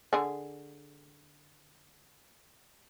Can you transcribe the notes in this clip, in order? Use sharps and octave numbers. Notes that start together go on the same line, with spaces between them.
D3 G#4